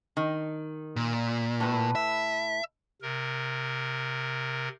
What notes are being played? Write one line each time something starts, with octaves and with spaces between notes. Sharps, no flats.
D#3
A#2
A2 B4
E5
C3 A#4